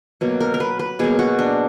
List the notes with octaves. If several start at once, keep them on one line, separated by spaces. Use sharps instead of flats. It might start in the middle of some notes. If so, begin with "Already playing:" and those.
B2 F#3 A#3
A#4
A#4
B4
B4
B2 F#3 A#3 G#4
F#4
D4